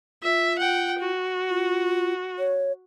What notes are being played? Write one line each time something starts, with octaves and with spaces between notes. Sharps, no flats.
F4 E5
F#5 G5
F#4
F4
C#5